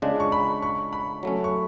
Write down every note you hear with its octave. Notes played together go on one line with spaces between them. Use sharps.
C#3 G#3 D4 F4
C#6
B5
C#6
B5
F#3 A3 C#4
C#6